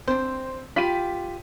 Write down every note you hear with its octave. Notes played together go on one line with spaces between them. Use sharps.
C4 D4 C5
F4 G4 B5 B6 D#7